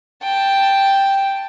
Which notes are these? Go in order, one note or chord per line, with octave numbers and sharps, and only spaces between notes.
G5 A5